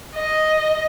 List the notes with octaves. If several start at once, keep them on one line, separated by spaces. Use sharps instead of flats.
D#5